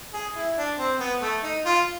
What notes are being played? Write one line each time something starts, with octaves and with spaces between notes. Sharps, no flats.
G#4
E4
D4
C4
B3
A3
D#4
F4